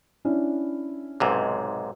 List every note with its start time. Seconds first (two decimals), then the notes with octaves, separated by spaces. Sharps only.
0.25 C#4 D4 E4
1.20 B1 G#2 C3